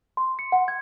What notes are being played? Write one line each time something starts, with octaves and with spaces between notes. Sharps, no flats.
C6
C#7
F#5
G#6